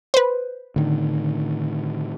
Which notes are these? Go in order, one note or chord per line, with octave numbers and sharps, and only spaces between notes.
B4 C5
A2 D3 D#3